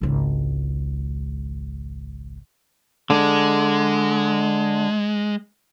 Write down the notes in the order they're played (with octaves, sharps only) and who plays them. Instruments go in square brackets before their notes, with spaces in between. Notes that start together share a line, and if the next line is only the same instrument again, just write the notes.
[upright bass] G#1 C#2
[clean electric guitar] D3 [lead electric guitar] G#3